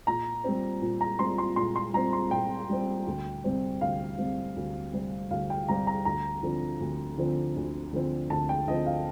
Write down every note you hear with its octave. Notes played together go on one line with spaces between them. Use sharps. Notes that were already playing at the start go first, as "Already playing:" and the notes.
A#2 A#5
G3 C4
A#2
A#5
G3 C4 C6
C6
A#2 C6
C6
G3 C4 A#5
C6
A#2 G5
G3 C4
D2
C3 G3 C4
D2 F5
C3 G3 C4
D2
C3 G3 C4
D2 F5
G5
C3 G3 C4 A#5
A#5
D2 A#5
D3 F3 C4
D2
D3 F3 C4
D2
D3 F3 C4
D2 A5
G5
D3 F3 C4 D#5
F5